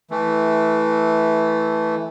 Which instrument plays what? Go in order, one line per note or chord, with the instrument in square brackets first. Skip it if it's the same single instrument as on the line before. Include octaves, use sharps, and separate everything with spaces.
[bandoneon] E3 A3